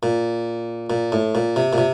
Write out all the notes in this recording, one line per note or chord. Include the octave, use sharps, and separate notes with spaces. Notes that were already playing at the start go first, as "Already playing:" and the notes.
A#2
A#2
A2
A#2
C3
A#2
C3